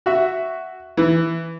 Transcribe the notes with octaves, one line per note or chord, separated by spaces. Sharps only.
F#4 E5
E3